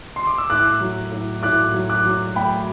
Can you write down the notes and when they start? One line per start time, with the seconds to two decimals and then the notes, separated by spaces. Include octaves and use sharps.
0.16 C6
0.27 D6
0.38 E6
0.50 A2 D6 F#6
0.80 F#3
1.12 A2
1.43 A2 D6 F#6
1.74 F#3
1.89 D6 F#6
2.05 F#3
2.35 A3 G5 B5